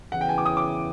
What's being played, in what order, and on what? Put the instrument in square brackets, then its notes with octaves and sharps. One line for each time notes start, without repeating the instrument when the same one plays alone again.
[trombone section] E2 C#3 E3 [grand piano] F#5
[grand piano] G5
G#5
D6
D#6
D6